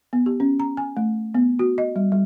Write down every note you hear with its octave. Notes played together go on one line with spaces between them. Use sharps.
B3
G4
C#4
A#5
G#5
A3
B3
F#4
D#5
G3
G3